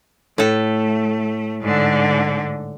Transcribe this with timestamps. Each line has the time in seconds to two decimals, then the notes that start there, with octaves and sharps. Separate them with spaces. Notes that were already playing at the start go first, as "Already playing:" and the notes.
0.38 A2 A3 A4
1.62 G#2 D3